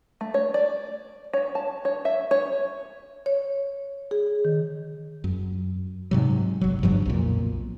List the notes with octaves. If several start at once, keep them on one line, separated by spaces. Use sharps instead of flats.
A3
C#5
D5
C#5
A5
C#5
E5
C#5
C#5
G#4
D#3
F#2
G#2 C3 F#3
G1 F#3
G2 C#3 F3 F#3
B1 F2 A#2